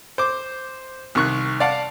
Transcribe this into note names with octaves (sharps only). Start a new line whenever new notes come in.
C5 D6
C2 D#3 C#6 F#6
D5 F5 F#5 A5